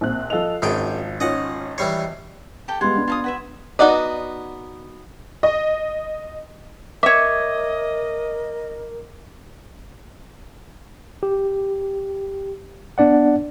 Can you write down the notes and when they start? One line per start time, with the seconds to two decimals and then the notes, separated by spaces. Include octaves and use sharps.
0.01 A#1 C4 F#6
0.30 F3 A4 D#5 F5 F7
0.62 G#1 F#2 G#4 G5
1.20 C#4 D#4 F4 D#5 F#5
1.78 E3 G3 C#5 C7
2.68 G4 A4 G5
2.81 G3 G#3 B3 F4 F#5 C6 G#6
2.96 B3 D4
3.08 F4 A5 D#6
3.24 F#4 B4 E5
3.79 B3 D#4 F#4 D5 D#5
5.43 D#5
7.03 A#4 C#5 D#5 E5 D6
11.23 G4
12.98 B3 D4 D5 F#5